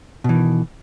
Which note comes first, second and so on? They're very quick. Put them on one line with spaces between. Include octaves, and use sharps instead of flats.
B2 E3 D#3